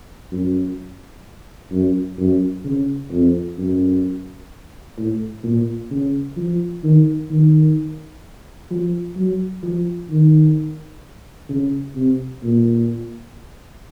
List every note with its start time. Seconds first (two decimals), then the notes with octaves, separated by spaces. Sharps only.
0.32 F#2
1.72 F#2
2.19 F#2
2.64 C#3
3.11 F2
3.58 F#2
4.98 A2
5.44 A#2
5.91 C#3
6.37 F3
6.84 D#3
7.30 D#3
8.71 F3
9.16 F#3
9.63 F3
10.10 D#3
11.50 C#3
11.96 C3
12.43 A#2